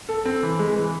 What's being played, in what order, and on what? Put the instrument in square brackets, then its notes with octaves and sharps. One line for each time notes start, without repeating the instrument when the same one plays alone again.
[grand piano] A4
C4
E3
G#3
E3